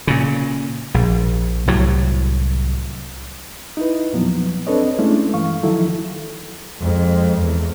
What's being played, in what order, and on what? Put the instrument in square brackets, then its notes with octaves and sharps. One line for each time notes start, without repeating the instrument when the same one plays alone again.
[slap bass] A#2 C#3
A#1
C2 A2 F#3
[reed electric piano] D#4 E4 B4
E2 A#2 F3 F#3 B3
C4 D4 A4 B4 C#5 D#5
G#3 A3 C#4 D4 E4
G2 E3 F5 C#6
D#3 F3 F#3 E4 A4
[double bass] F2 G#3
E2